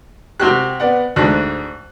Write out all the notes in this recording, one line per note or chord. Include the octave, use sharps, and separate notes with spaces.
C3 F#4 G4 F#6
B3 D5 F#5
D2 G#2 F#6